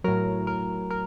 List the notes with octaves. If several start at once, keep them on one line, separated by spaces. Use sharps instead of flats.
A2 F#3 A#4
A#4
A#4